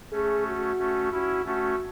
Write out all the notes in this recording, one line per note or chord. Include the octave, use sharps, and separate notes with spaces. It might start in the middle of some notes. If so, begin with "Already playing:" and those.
A3 C#4 G#4
F#4
A3 C#4
C#4 E4 F#4
A3 C#4 F#4